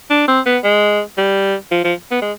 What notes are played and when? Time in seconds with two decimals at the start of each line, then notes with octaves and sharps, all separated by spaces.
0.10 D4
0.28 C4
0.46 B3
0.64 G#3
1.18 G3
1.71 F3
1.84 F3
2.11 B3
2.22 G#3